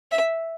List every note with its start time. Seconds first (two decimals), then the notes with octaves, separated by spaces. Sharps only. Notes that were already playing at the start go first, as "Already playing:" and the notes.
0.11 E5